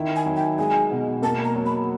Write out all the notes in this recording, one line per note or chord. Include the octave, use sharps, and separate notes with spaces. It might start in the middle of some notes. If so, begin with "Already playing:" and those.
Already playing: D#3 E4
G#5
F#3
G5
G#3 G#5
B2
A#3 A5
A#5
F#3
B5